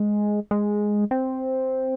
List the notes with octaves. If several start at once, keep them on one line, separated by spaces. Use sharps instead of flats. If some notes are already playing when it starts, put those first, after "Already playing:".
Already playing: G#3
G#3
C4